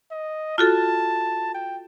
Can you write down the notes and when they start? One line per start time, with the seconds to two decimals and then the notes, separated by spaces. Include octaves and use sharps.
0.11 D#5
0.58 F4 F#4 A4 A5
1.55 G5